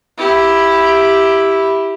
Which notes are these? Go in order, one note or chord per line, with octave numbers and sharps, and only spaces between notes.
E4 G4